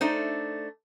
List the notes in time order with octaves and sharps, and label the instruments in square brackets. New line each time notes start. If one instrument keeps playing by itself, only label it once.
[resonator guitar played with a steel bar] A3 D4 D#4 C5